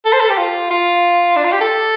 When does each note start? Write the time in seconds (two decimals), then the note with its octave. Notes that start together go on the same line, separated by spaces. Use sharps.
0.05 A4
0.13 C5
0.21 A4
0.29 G4
0.38 F4
0.71 F4
1.36 D4
1.44 F4
1.53 G4
1.61 A4